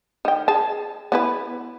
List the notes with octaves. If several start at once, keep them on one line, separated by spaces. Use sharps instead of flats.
D#3 G5
G#4 A5
B3 E4 B4